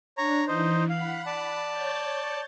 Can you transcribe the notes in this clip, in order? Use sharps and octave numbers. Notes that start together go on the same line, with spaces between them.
D4 C#5 A#5
E3 D#4 C5
F5 F#5 B5
D5 A5
C#5 G6 A6